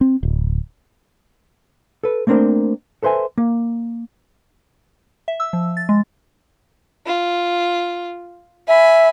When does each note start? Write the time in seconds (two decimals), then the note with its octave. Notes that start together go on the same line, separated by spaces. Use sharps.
0.01 C4
0.23 D1
2.04 A4 B4
2.27 A3 A#3 C4 D4 A#4 C5
3.03 A4 B4 C5 E5 G#5
3.38 A#3
5.28 E5
5.40 E6
5.53 F3
5.77 A6
5.89 G#3
7.06 F4
8.68 E5 G#5 B5